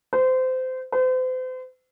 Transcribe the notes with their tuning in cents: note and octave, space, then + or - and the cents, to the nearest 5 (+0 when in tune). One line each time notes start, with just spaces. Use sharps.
C5 -25
C5 -40